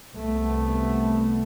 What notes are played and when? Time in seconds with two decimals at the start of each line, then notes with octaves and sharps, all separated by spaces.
0.15 C2 A3 B3